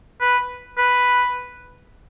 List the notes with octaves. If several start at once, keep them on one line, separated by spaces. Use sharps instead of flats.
B4
B4